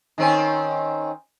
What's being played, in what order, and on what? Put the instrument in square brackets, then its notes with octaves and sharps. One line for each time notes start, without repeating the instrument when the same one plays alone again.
[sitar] D#3 C4 C#4